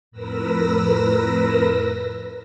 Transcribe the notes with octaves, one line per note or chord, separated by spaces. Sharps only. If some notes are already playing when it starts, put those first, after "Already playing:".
F2 A2 A#4 B4 E6 A#6